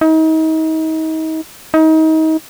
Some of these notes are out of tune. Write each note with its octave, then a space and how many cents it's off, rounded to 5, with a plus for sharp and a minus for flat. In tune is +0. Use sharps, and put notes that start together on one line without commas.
D#4 +35
D#4 +30